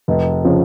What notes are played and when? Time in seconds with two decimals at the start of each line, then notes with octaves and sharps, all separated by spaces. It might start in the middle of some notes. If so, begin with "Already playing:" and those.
0.08 F1
0.45 C#3 F3